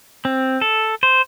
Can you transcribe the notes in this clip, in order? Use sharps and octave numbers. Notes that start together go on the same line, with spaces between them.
C4
A4
C5